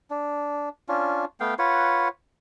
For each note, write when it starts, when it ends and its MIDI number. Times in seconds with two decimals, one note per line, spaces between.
0.10 0.69 62
0.89 1.25 61
0.89 1.25 62
0.89 1.25 65
1.40 1.54 57
1.40 1.54 59
1.40 1.54 77
1.40 1.54 79
1.59 2.08 65
1.59 2.08 71
1.59 2.08 73
1.59 2.08 78